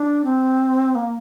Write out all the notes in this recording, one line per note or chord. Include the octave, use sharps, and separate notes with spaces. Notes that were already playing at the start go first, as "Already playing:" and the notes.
Already playing: D4
C4
A#3